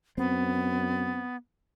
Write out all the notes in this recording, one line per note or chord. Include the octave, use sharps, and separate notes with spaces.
F#2 B3 C4